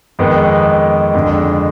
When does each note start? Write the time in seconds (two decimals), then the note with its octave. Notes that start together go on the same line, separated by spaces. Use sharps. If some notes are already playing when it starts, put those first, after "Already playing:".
0.19 F2 D#3 G#3 B3
1.14 F2 D3 G#3